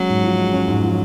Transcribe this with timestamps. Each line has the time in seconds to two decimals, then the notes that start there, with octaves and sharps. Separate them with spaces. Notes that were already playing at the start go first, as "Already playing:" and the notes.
Already playing: F#3 G#3 C#4
0.09 G#2
0.23 F3
0.38 G#3
0.53 C#4
0.68 G#2
0.83 F3